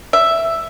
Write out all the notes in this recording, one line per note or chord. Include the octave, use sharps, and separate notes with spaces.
E5